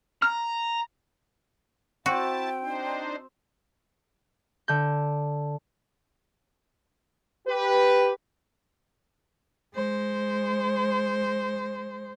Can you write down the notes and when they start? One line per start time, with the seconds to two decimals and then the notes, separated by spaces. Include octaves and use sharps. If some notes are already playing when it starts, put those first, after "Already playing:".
0.22 A#5 F6
2.06 C4 E4 F#4 G5 A5
2.61 D4 D#4 C5
4.68 D3 G6
7.47 G4 B4
9.74 G#3 C5